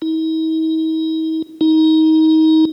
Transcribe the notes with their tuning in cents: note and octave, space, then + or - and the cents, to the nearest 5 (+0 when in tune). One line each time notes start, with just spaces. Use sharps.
D#4 +45
D#4 +25